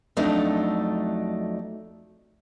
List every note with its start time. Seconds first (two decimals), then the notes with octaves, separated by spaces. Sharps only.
0.17 F2 F#3 A3 D4 D#4